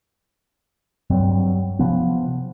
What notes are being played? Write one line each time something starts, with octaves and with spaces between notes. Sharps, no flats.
G2 F#3 C4
C3 F3 B3